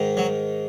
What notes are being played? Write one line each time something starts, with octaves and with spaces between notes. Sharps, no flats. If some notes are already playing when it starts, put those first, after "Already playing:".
Already playing: G#2 D#3
F#3